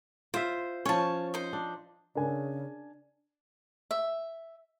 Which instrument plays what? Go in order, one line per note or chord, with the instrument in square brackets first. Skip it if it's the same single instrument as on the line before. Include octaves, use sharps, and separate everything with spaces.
[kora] F4 E5 [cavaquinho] C5
[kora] F3 C#4 [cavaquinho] C#5 A5
[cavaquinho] D#4 C5
[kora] D4
[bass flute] C#3 [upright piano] D4 A#4 G#5
[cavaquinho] E5